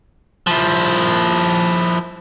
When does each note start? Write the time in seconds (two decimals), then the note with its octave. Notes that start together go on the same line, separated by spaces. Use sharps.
0.47 F3 E4